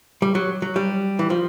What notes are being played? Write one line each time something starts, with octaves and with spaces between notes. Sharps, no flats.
G3
F#3
F#3
G3
E3
F3